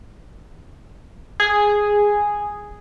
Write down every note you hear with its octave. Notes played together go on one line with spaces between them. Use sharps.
G#4